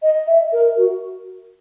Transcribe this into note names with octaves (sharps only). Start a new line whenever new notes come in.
D#5
E5
A#4
F#4